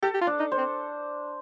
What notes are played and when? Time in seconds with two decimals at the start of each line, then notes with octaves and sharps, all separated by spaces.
0.02 G4 A4
0.14 G4
0.21 F4
0.27 D4
0.40 D#4
0.52 C5
0.58 C4